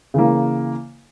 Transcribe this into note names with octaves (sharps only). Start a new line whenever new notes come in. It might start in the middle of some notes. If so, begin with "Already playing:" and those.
C#3 E3 A#3